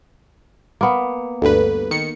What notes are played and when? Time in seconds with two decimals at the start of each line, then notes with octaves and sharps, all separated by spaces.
0.81 A#3 B3
1.42 D2 G2 A4 B4
1.91 D#3 C#7